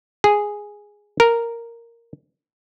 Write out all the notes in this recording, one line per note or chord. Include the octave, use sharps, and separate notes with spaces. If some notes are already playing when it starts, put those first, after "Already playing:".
G#4
A#4